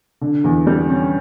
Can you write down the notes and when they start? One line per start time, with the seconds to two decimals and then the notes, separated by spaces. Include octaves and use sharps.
0.21 D3
0.44 E2
0.67 G3
0.90 C#4